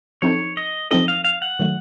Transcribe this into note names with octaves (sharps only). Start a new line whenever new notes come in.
F3 C4 D#4 A4 C#5
D#5
F3 C4 D#4 A4 D#5
F5
F5
F#5
D#3 F#3 A3